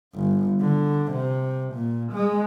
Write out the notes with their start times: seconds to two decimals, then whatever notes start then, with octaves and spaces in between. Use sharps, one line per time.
0.15 G1
0.61 D3
1.12 C3
1.74 A#2
2.12 G#3